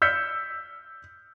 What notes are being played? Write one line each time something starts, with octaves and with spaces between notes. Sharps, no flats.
E6 F6 G6 B6 C#7